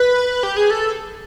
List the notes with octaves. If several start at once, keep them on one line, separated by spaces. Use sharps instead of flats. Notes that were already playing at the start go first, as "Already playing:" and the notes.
Already playing: B4
G4
G#4
A4